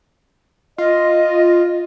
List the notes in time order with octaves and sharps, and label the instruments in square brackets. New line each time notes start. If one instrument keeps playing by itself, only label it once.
[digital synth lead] F4 [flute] D#5